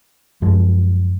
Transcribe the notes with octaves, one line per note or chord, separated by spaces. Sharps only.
F#2 F3 G#3